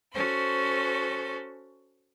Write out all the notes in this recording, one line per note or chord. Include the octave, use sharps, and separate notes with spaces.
C#4 F#4 A4 C5